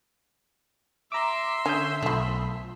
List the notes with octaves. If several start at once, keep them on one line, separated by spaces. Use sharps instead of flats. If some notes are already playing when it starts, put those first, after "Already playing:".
E5 A#5 C6 D6
D3 C#4 D#6 G6
B1 F3 A3 B5